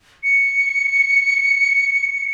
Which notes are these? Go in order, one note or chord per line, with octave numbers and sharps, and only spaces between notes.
C#7